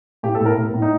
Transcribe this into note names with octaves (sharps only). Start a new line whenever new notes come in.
A2 G4
A4
A2
A#4
A2
A2
D#4